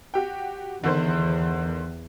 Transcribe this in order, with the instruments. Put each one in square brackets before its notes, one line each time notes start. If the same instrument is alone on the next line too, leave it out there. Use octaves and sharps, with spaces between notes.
[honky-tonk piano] F#4 G4 G5
[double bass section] E2 [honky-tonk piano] D3 D#3 C5